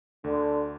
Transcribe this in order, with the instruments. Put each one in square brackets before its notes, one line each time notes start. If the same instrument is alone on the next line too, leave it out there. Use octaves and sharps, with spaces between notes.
[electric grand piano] D2 [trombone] D3